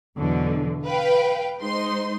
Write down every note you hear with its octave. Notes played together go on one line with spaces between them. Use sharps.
E2 B2 D3 E3 F#3
B4 F5 G5
G#3 D#4 C5 C6